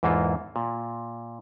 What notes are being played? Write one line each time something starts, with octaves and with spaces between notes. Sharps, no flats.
E2 G#2 E3 A#3 F4 A4
A#2